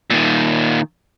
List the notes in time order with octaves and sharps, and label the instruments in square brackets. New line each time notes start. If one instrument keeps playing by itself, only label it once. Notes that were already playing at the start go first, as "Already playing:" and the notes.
[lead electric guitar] A#2 D#3